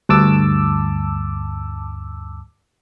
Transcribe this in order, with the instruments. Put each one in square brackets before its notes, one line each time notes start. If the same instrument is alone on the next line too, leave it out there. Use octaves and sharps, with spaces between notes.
[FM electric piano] D2 G2 A5 D6 E6